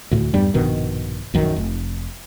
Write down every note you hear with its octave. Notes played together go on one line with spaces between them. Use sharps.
D2 A2
E2 G2 G3 D4
A#1 G2 B2 D#3
A#1 F#2 D#3
F1